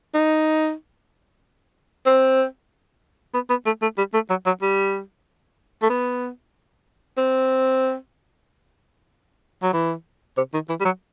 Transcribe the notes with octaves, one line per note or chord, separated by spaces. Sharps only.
D#4
C4
B3
B3
A3
A3
G3
A3
F#3
F#3
G3
A3
B3
C4
F#3
E3
C3
D#3
E3
G3
F#3